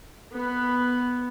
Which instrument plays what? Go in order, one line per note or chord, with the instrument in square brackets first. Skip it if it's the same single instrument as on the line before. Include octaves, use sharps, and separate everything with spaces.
[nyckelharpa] B3 B4